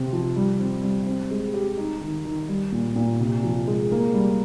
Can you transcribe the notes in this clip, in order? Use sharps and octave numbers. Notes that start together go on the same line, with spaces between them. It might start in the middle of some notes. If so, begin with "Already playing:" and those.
Already playing: C3 C4
F3
G3
C4
G3
C4
G#3
G4
D#4
D#3
D#3
G3
A#2
A#2
C3
F3
G#3
A#3
G3